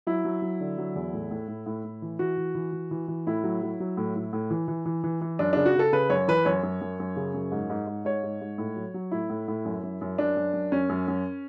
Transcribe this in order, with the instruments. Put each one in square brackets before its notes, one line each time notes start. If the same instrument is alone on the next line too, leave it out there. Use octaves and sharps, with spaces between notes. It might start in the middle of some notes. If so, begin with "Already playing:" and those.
[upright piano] F#3 E4
F#3
F#3
D3
F#3
E2
A2
A2
A2
A2
A2
E3
E3 F#4
E3
E3
E3
E3
E3
A2 E4
F#3
F#3
F#3
A2
A2
A2
E3
E3
E3
E3
E3
F#2 D4
C#3 D4
F#4
C#3 A4
C#3 B4
F#2 C#5
E3 B4
F#2 C#5
F#2
F#2
F#2
C#3
F#2
G#2
G#2
G#2
G#2 C#5
G#2
G#2
A2
F#3
F#3
A2 E4
A2
A2
F#2
F#2
F#2
F#2 D4
F#2
F#2
F#2 C#4
F#2
F#2